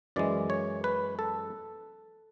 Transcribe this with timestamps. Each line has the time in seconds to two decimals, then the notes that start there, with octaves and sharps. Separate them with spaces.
0.16 F#2 E3 G#3 D5
0.50 C#5
0.84 B4
1.19 A4